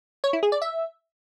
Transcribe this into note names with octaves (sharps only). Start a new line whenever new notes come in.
C#5
E4
G#4
D5
E5